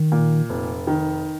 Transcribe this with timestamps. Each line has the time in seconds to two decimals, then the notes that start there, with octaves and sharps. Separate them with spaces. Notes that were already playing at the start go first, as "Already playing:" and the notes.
Already playing: D#3
0.12 A#2
0.50 F1
0.87 D#3